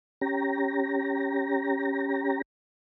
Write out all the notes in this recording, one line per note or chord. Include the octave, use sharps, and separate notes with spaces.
C#4 G4 A#5